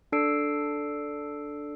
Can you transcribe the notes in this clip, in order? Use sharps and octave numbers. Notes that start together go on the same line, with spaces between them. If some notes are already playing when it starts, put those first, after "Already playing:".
D4 A4 D5 E6 C7 D7